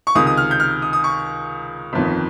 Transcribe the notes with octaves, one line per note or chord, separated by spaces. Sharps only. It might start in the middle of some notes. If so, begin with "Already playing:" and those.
C#6
C#2 C3 D#3 D#6
D#6
F6
G6
F6
D#6
D#6
C#6
G1 F2 D#3